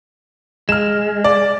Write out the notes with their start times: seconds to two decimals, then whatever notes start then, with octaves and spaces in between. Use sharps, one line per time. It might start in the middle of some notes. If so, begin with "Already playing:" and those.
0.69 G#3 F6 E7
1.24 D5